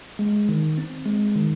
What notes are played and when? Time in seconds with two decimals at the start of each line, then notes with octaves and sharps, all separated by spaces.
0.19 G#3
0.49 D#3
0.78 C4
1.06 G#3
1.36 D#3